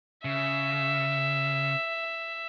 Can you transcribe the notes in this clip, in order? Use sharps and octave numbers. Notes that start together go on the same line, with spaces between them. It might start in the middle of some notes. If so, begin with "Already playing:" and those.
C#3 E5